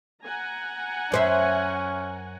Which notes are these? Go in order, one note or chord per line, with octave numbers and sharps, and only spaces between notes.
F#5 G#5 A#5
F#2 C#4 C5 E5